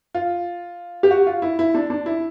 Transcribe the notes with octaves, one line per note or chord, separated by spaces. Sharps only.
F4
G4
F#4
F4
E4
E4
D4
D4
E4